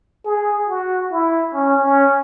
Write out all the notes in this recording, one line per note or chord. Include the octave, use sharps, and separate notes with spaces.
G#4
F#4
E4
C#4
C#4